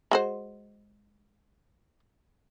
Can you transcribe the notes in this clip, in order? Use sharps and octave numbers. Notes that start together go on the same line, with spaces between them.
G#3 F#4 C5